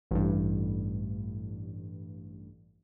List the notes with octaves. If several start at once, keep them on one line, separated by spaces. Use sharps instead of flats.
A1 G2